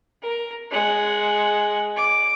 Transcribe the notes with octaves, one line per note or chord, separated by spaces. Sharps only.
A#4
G#3 F#5
D6